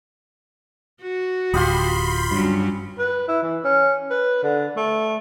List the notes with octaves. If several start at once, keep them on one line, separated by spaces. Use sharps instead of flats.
F#4
D1 F4 G4 B5 C6 D#6
G2 F#3 C#4
B4
E4
E3
C#4
B4
D3
A3